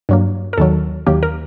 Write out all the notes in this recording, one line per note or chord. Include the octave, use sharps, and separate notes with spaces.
G2 F#3 A#3
A#4
D#2 D#3 F#3 A4
D#2 D#3 F#3 A#3 G4
A#4